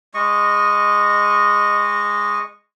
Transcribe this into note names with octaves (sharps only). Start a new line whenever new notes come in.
G#3 D#5 C#6